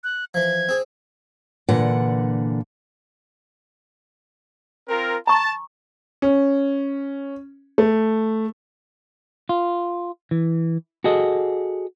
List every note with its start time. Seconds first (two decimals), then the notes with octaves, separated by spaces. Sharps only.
0.04 F#6
0.34 E3 F3 G#6
0.69 C4 G#4
1.69 A#2 D3 E3 F#5
4.89 C4 F4 A#4
5.27 A5 A#5 C#6
6.22 C#4
7.78 A3
9.49 F4
10.31 E3
11.04 F#4 G#4 A4 D#5